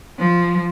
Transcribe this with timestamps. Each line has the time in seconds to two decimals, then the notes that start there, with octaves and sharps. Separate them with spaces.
0.18 F3